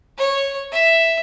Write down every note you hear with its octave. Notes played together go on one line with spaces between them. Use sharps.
C#5
E5